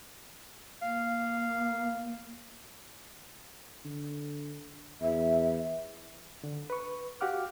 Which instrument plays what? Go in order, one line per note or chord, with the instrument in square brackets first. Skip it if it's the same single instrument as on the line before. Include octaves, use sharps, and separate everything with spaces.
[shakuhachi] A#3 [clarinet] F5
[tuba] D3
[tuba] E2 [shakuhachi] E5
[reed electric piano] D3
B4 C#6
F#4 G4 F5 F#5 D6 F6